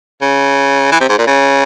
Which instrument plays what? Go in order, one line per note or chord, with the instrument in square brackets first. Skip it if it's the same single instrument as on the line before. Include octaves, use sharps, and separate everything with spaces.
[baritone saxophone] C#3
E3
C3
G#2
A#2
C#3